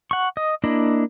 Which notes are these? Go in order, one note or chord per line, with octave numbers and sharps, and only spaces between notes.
F#5 C#6
D#5
A#3 D4 E4 D#5